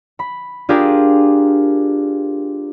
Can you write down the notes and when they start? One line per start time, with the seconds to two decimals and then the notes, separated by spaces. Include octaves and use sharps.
0.19 B5
0.69 D4 F4 G4 G#4 A#4